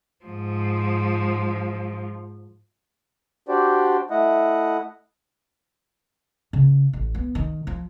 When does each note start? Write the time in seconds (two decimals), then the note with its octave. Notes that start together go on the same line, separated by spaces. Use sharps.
0.25 G#2 F3
3.49 D4 F#4 G4 C5 D5
4.11 A3 E4 D#5 F#5
6.53 C#3
6.93 A1
7.15 B3
7.35 D#3
7.67 F3